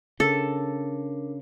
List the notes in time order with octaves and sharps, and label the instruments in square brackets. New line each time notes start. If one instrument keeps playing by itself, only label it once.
[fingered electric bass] C#3 [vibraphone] D4 A#4 [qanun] A4